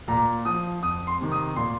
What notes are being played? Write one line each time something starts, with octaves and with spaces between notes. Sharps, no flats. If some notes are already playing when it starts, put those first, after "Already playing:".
A#2 A#5
F3 D#6
F2 D#6
C6
C3 D#3
D#6
A#2 C6